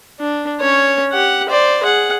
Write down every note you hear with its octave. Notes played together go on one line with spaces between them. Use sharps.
D4
C#4 C#5
G4 F#5
C5 D5
G#4 F#5